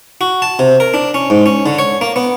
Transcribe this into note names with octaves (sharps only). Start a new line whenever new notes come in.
F#4
A5
C3
A#4
D4
C#4
G#2
C#4
D3
C#5
A#3
B3